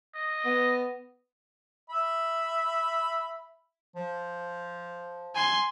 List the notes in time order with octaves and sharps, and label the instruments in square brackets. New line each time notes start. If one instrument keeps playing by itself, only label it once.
[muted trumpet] D#5
[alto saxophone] B3
[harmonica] E5 B5
[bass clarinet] F3
[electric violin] G#5 C6